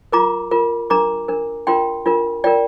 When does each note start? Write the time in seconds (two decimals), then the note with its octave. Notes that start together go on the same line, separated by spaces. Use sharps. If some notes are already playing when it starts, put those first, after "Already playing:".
0.12 F4 A#4 A#5 D6
0.51 F4 A#4
0.90 D4 A#4 A#5 D6
1.28 D4 A#4
1.67 D4 F4 A#4 G5 C6
2.06 D4 F4 A#4
2.44 F4 A#4 D5 G5